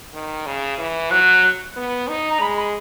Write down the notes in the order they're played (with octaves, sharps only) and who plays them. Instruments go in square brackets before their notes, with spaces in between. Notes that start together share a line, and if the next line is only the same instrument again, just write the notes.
[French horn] D#3
C#3
E3
[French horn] F#3 [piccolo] F#6
[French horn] B3
D#4
[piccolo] A#5
[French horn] G#3 [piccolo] B5
[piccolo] B5